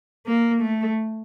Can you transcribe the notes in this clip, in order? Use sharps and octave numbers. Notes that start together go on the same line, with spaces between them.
A#3
A3